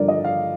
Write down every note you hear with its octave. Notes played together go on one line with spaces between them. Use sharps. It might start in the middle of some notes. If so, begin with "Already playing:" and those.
Already playing: G2 D3 F3 A#4 D5
D#5
F5